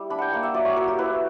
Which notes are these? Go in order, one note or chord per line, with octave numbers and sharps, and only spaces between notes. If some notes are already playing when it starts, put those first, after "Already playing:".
Already playing: G3 E4
D4 B5
F#5 G5
A#3 F#5
E5
F#3 D5
C#5
F#3 A#4
G4
E4 B4